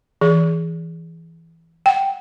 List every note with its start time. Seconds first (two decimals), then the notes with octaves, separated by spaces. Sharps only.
0.21 E3 G#4
1.86 F#5 G5